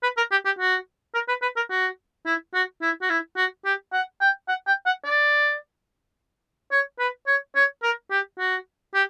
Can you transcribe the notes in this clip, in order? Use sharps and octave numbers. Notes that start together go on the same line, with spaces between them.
B4
A#4
G4
G4
F#4
A#4
B4
B4
A#4
F#4
E4
F#4
E4
F#4
E4
F#4
G4
F#5
G5
F#5
G5
F#5
D5
C#5
B4
C#5
C#5
A#4
G4
F#4
G4